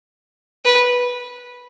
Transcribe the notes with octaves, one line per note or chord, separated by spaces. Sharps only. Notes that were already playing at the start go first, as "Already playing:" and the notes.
B4